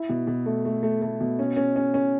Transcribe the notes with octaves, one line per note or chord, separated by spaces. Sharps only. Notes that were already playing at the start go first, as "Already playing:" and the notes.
Already playing: E4
B2
B2
A3
A3
A3
A3
B2
C#4
C#4
C#4
C#4